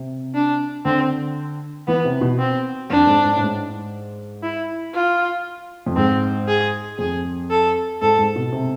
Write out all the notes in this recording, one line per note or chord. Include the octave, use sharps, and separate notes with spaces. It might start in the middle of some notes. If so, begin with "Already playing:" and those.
Already playing: C3
D4
D3 C4
E3 B3
C3
B2
C4
F2 D4
G#2
G#2
A2
G#2
E4
F4
F2
G#2 C4
G#4
F2 G#4
A4
G#2 A4
G#2
B2
C3